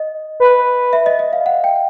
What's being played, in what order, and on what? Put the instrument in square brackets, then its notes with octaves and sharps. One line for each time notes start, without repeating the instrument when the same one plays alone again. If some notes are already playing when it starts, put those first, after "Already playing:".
Already playing: [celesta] D#5
[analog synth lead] B4
[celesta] E5
D#5
D#5
F5
F#5
G5